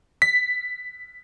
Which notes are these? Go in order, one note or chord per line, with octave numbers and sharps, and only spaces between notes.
B6